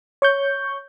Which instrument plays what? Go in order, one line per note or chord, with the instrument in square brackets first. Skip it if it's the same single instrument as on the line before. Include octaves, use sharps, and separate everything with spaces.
[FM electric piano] C#5 C#6 G6